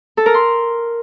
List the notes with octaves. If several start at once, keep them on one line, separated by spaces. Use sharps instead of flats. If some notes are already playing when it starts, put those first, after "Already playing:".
A4
A#4
C6